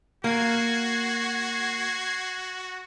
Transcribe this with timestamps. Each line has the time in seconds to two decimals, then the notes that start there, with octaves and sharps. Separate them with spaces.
0.24 A#3 F#4 G#6 C7